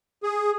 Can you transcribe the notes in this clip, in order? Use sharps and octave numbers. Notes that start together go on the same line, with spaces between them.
G#4